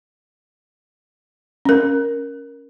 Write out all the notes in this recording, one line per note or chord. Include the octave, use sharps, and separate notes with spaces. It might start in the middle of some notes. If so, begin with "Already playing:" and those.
C#4 A#4